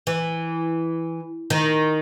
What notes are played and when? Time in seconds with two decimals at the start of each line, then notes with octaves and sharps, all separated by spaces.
0.07 E3
1.50 D#3